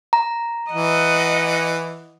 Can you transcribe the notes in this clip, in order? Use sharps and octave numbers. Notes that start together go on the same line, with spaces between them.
A#5
E3 D#5 F#5